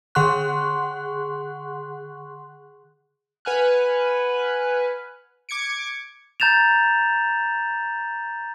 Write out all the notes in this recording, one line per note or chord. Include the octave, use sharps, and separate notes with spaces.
D3 G#4 F#5 C6 C#6 F#6
B4 F#5 G#5 F6 F#6
D6 G#6 C#7 D7
A#5 G6 A6 E7 F7